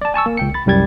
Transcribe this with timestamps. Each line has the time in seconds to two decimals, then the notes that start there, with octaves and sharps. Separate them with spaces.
0.01 D5 A5
0.14 G#5 A5 C#6 E6
0.26 A#3
0.37 C#2 G5 C#7
0.54 B5 A6
0.66 C2 F#2 G3 G5 G#6 A6